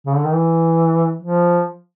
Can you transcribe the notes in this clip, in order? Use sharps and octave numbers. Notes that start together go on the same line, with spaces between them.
C#3
D3
D#3
E3
F3